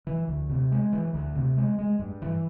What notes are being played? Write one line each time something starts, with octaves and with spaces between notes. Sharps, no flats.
E3
D2
C3
G#3
E3
D2
C3
G#3
G#3
G2
E3